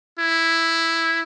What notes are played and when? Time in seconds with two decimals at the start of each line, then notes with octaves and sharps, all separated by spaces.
0.19 E4